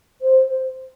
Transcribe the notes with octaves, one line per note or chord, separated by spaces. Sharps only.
C5